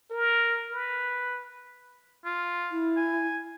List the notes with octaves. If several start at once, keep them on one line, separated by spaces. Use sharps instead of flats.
A#4
B4
F4
E4
G#5